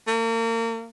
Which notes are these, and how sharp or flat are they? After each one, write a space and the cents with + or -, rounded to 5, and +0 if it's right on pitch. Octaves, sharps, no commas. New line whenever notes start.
A#3 -35